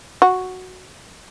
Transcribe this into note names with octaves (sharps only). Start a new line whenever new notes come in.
F#4